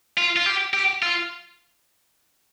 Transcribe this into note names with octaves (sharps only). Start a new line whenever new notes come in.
F4
F4
G4
G4
F4